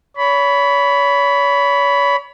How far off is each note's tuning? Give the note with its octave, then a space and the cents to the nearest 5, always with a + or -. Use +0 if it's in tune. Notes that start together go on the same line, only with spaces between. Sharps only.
C#5 +35 B5 +0